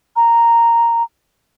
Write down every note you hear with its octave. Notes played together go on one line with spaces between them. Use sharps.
A#5